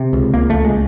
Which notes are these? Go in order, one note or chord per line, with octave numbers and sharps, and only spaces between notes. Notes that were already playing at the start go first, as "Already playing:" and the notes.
Already playing: C3
C#2
C#2 A#3
C#2 A3
G#3